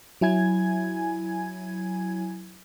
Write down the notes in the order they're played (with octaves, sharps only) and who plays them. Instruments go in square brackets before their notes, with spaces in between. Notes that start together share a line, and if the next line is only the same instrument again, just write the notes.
[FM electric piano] F#3 E4 G#5 G#6